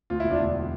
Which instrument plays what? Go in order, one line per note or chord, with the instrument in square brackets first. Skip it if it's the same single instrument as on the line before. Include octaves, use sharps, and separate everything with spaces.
[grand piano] D2 F4
E1 E4
D4 F4
D2